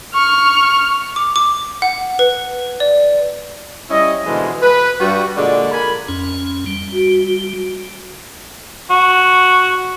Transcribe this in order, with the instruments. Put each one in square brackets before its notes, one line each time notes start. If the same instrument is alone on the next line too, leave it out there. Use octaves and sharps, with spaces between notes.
[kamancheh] C#6 F6
[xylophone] D6
D6
F#5
B4
D5
[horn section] G3 C#4 E4 D#5
B2 D3 E3 F3 G#3
B4
G2 G3 F#4
A#2 D3 G#3 D5
A#4 G#5 B5
[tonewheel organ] F2 C#4
G3
[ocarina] F#4
[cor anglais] F#4